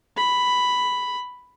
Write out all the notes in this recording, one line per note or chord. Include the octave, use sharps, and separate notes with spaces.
B5